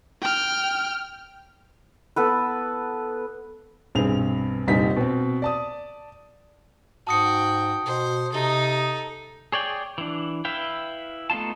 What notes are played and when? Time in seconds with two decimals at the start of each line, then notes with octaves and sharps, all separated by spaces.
0.22 G5 F6
2.16 B3 A4 B4
3.95 B1 G2 C4 G#4 F7
4.67 F1 A#1 G3 D#4 B6
4.96 B2 C4
5.42 D5 A5 D#6
7.07 G#2 F#4 G5 A5 D#6 C#7
7.86 B2 C5
8.33 C3 D#4 A4
9.52 G#4 C#5 D5 G5
9.98 E3 D4
10.45 E4 B4 E5 F5 G5
11.30 A3 B3 D#4 F4 A5